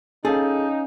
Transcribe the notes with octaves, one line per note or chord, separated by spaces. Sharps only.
C#4 D#4 G#4 A4 F5